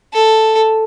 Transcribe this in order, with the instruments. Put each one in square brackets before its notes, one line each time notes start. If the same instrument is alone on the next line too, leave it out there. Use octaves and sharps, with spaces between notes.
[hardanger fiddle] A4